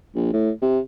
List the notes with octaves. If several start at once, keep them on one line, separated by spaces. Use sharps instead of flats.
A#1
A2
C3